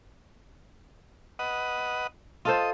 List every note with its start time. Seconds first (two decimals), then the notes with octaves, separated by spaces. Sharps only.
1.39 B4 D#5 F#5
2.45 F4 A4 C5 D#5